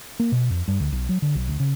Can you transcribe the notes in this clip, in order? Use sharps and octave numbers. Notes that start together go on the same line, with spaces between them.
A#3
B2
F2
G2
D2
B1
F#3
D3
B1
D2
C#3